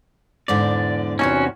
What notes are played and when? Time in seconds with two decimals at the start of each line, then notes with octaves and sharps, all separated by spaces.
0.48 E2 G#2 D3 D5
1.19 E2 C3 C#4 D#4 F#4